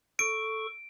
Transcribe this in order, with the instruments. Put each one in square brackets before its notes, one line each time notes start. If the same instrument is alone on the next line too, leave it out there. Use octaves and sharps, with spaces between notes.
[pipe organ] A4 C#6 [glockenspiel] D7